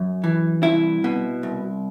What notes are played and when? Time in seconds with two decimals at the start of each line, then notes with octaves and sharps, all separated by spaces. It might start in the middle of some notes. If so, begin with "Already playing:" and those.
Already playing: F#2
0.24 E3
0.63 C2 E4
1.04 B2
1.43 C2